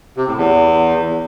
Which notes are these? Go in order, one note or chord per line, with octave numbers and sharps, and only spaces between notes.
C3
A2
E2